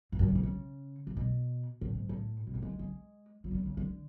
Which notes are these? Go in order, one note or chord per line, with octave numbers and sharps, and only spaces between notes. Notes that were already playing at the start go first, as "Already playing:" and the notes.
G#2
F#2
G#2
B2
C#3
A2
B2
A2
G#2
A2
B2
F#3
G#3
G#3
F#3
E3
D3
C#3
D3